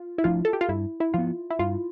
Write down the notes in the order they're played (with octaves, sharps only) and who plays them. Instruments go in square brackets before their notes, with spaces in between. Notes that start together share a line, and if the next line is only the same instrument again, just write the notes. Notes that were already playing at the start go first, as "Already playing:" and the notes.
Already playing: [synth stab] F4
E4
[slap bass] F3 A3 D4 [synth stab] F4
[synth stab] A4
G4
F4
[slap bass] G2 [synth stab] E4
[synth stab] E4
[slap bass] F3 B3 [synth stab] F4
[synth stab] E4
[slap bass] G2 [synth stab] F4